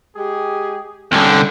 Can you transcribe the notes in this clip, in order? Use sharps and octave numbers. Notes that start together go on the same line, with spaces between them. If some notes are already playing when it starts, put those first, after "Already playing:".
G#3 G4 G#4
C2 D3 C#4 G5